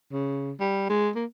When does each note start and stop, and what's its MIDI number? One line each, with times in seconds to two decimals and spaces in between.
0.12 0.51 49
0.60 0.89 55
0.89 1.10 56
1.16 1.25 58